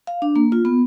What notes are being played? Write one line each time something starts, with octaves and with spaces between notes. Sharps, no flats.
F5
D4
A#3
F4
B3